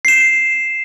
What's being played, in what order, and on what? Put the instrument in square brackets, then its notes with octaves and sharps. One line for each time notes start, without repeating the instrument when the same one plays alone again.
[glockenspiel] C7 E7